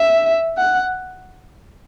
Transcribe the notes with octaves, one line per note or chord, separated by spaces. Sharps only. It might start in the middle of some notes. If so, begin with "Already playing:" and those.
Already playing: E5
F#5